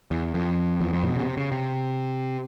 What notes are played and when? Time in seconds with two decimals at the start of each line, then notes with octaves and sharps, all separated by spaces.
0.11 E2
0.34 F2
0.81 E2
0.93 F2
1.04 A#2
1.07 B2
1.16 C#3
1.23 C3
1.37 C#3
1.52 C3